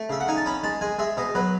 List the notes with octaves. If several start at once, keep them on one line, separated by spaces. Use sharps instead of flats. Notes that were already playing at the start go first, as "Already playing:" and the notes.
Already playing: A3
C#3 E5
F#5
D#4 G#5
A5
C#4 B5
G#3 A5
G#3 G#5
G#3 E5
B2 D#5
F#3 B4